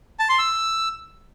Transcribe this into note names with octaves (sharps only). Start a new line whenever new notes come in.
A5
C6
E6